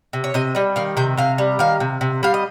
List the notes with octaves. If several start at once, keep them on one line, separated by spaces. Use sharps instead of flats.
C3
C#5
C3 D#5
G3 D#5
D#3 F5
C3 G5
C3 F5
G3
D#3 F5
C3
C3
G3 F5
D#5